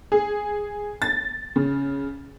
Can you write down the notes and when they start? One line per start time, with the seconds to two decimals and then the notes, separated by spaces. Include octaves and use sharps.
0.12 G#4
1.02 A6
1.56 C#3